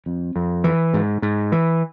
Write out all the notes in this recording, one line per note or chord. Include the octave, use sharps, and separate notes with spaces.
F2
F2
E3
G#2
G#2
E3